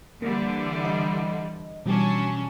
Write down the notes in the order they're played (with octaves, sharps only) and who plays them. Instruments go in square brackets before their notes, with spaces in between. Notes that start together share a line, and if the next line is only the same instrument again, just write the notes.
[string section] D3 E3 G3 [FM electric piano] A#3
[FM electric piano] D#5
[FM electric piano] B2 E3 G3 [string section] F#3 C#4 D4